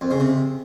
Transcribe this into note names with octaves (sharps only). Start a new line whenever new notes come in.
F2
C#3
C3